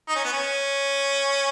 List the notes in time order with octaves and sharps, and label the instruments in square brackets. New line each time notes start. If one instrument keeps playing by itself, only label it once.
[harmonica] D#4
C#4
B3
C#4